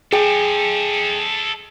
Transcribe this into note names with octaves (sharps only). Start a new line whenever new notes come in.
G#4 A4 D#5 G5